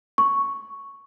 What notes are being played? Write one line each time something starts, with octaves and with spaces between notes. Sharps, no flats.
C#6